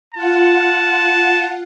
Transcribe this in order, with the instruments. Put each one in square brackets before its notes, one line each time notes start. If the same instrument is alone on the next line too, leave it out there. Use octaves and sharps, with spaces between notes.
[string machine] F4 F#5 [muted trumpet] A5